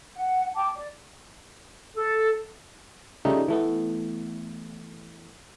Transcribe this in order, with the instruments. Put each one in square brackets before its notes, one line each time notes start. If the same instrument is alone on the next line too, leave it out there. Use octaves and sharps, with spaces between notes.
[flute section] F#5
G5 A5 D6
D5
[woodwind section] A4
[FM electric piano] C#3 F3 G3 A3 D#4
E3 A3 B3